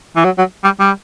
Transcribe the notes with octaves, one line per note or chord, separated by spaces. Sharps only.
E3
F#3
F#3
G3
G3